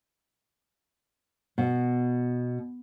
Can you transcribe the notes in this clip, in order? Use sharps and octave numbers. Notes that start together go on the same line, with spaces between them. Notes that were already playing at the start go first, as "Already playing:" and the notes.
B2